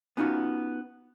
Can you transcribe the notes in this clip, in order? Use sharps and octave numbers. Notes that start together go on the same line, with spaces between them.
B3 C#4 D#4 F4 F#4